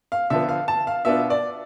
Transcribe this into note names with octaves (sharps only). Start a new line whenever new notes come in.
F5
D3 F3 B3 E5
F5
A5
F5
B2 B3 D4 F4 E5
D5